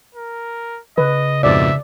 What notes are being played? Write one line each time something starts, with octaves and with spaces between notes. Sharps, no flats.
A#4
C#3 B4 D#5
F2 G#2 B2 D5 E5